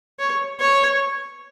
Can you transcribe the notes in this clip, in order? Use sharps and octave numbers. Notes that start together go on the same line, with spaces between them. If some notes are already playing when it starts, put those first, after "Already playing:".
C#5
C#5